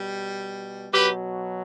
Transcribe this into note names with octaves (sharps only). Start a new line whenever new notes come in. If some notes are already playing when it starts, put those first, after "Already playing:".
Already playing: B2 G3
B2 F#3 G4 B4